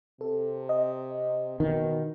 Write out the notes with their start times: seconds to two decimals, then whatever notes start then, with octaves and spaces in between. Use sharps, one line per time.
0.21 C3 A4
0.69 D#5
1.60 B2 D#3